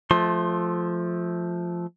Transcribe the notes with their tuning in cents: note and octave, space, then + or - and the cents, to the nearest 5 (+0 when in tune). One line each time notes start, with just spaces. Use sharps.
F3 +0 A3 -15 C6 +25